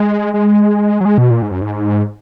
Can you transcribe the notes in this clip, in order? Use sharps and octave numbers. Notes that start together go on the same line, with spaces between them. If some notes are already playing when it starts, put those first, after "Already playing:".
Already playing: G#3
G#3
F#3
G#3
B2
A#2
G#2
F#2
G#2